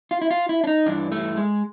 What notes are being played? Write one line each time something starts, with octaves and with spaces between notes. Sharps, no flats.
F4
E4
F4
E4
D4
D#4
G2 E3 D4
A3
G#3